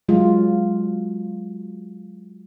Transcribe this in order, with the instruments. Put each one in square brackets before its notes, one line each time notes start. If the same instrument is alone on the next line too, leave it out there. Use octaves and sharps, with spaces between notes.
[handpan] F#3 G#3 F4